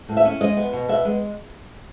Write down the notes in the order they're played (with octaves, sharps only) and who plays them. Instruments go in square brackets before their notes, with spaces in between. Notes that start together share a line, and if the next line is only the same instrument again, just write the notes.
[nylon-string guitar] A2
E5
C#4
G#3 D#5
B3
B2
B3 E5
G#3